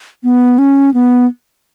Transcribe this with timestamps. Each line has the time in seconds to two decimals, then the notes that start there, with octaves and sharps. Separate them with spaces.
0.24 B3
0.58 C#4
0.94 B3